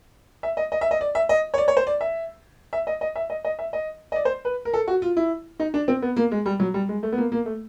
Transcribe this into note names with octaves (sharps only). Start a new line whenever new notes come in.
E5
D#5
D#5
E5
D#5
D5
E5
D#5
C#5
D5
C#5
C5
D5
E5
E5
D#5
D#5
E5
D#5
D#5
E5
D#5
D#5
D5
C5
B4
A#4
A4
F#4
F4
E4
D#4
D4
C4
B3
A#3
G#3
G3
F#3
G3
G#3
A3
B3
A#3
A#3
A3